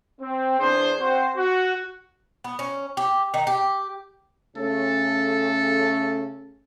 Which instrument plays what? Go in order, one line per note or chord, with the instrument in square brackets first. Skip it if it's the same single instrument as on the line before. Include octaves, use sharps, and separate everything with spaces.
[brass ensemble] C4
E2 D4 G#4 C5
C4 F#4 C5
F#4
[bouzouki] B3
C#4
G4
D#3
G4
[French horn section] C#3 A3 C#4 [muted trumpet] A4